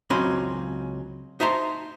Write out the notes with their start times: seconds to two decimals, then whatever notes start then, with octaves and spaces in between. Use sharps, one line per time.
0.10 C#2 F#3 C4 C#4 B5 C6
1.40 D#4 C5 E5 A5 A#5 C6